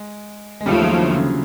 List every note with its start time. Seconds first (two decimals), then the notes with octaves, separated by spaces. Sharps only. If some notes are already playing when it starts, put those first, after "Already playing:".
Already playing: G#3
0.61 G#3
0.66 D#2 C#3 F3 G3 A3
0.82 F#3
0.99 D3
1.15 C#3